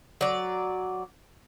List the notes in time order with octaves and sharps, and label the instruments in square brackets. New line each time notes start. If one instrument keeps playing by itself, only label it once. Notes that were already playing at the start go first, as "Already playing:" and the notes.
[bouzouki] F#3 D5